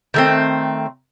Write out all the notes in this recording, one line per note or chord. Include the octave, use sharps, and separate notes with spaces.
D#3 A3 C4